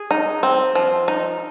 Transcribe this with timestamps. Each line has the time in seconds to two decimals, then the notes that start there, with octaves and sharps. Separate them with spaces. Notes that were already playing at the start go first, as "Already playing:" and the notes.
Already playing: G#4
0.11 D#4
0.43 C4
0.75 F3
1.08 D#4